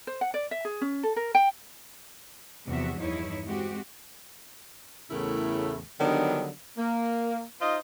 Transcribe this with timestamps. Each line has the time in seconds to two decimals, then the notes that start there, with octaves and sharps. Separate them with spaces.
0.07 C5
0.21 F#5
0.34 D5
0.51 E5
0.65 G#4
0.81 C#4
1.03 A4
1.16 A#4
1.35 G5
2.67 E2 C3 F3 B3 F#4 E5
3.00 E2 G2 D#4 E4 C#5
3.46 G#3 C4 F#4 G4
5.11 E2 A2 C#3 A3 E4 A#4
6.00 D3 D#3 F#3 G3 B3 D4
6.78 A#3
7.61 D#4 F4 C5 D#5